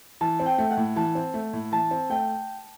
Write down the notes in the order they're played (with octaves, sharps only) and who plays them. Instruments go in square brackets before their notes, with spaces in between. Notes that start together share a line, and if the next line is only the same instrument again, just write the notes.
[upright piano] E3 [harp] A5
[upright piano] C4
[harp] G5
[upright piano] A3
[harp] F#5
[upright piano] A2
[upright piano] E3 [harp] A5
[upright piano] C4
A3
A2
[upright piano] E3 [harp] A5
[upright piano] C4
[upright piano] A3 [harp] G5